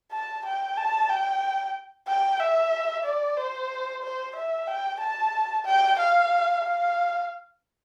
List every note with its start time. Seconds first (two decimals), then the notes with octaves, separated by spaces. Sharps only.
0.12 A5
0.45 G5
0.77 A5
1.09 G5
2.07 G5
2.39 E5
3.04 D5
3.37 C5
4.03 C5
4.35 E5
4.67 G5
5.00 A5
5.65 G5
5.99 F5
6.63 F5